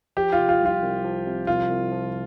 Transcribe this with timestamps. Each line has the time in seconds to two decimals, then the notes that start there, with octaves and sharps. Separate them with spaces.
0.17 F3 G4
0.32 F4
0.38 C3
0.49 F4
0.61 C2 F4
0.82 C2
1.04 F3
1.26 C3
1.47 C2 F4
1.70 C2
1.92 F3